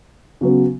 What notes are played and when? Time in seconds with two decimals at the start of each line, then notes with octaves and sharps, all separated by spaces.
0.41 C#3 F#3 B3